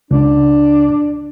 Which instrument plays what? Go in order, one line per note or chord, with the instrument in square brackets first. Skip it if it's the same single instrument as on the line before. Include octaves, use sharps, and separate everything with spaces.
[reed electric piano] C#2 [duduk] D4